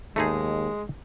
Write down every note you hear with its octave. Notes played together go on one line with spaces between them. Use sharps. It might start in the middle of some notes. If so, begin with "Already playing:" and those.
D#2 G#3 A3 D#4 G#4